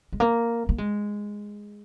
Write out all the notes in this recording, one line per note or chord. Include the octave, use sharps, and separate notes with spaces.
G#3
A#3
A#3
G#3